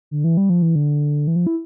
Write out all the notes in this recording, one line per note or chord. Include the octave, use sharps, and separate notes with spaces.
D3
E3
G3
F3
E3
D3
E3
F3
E4